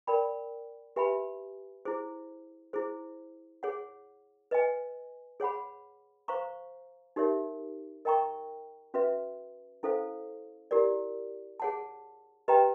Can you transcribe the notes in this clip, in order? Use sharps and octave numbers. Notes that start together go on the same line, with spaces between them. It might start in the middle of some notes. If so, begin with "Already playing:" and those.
A#4 D5 G5 B5
G4 B4 E5 G#5 B5
E4 G#4 C5
E4 G#4 C5
G#4 C#5 F#5
B4 D#5 G#5
G#4 C#5 F#5 B5
C5 F5 A#5 C#6
D#4 G4 A#4 C#5 E5
A#4 D#5 G5 A#5 C#6
C#4 F#4 B4 E5
C#4 E4 A4 C5 F5
E4 G4 A#4 D5
G#4 C#5 F#5 A5
G4 B4 D#5 G5 A#5